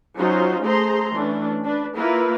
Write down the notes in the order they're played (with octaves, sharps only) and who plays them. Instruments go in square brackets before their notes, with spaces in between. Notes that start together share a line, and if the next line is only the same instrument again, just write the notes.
[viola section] F#3 C#4 D#4 F4 F#4 C5
A3 G#4 C5 A#5 C6
E3 A3 C#4 D4
D4 B4
A#3 E4 F4 A#4 B4